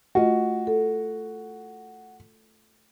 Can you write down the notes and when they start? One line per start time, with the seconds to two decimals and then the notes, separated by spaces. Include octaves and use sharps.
0.15 A3 F4 F#4 D#5
0.67 A4